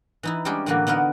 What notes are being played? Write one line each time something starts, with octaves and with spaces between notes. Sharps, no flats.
E3 D#4 E4
G3 G#3 C#4 D4 G4 G#4
A2 D3 E3 G3 A#3 F#4
D3 B3 D#4 A#4 F#5